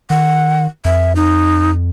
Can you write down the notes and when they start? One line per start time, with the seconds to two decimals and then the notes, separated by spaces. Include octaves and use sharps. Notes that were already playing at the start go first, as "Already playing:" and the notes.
0.10 D#3 F#5
0.85 F2 E5
1.16 D#4